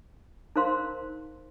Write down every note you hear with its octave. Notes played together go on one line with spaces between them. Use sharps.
D#4 A#4 C5 F5 C6